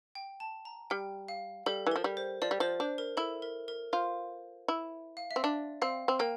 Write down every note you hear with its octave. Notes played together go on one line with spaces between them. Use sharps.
G5
A5
A#5
G3 G5
F5
G3 A4
E3
F3 A#4
G3
C5
F3 D5
G3
F3 C5
D4 C5
A#4
E4 A4
A#4
A#4
F4 C5
E4
F5
E5
C4
D4 D5
C4 F5
C4
A#3 G5